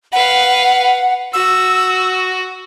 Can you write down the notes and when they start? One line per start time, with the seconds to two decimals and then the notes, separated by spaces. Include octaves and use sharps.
0.13 B4 F5 F#5
1.33 F#4 E6